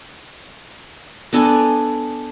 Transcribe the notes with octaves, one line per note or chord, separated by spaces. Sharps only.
B3 D4 A4 G#5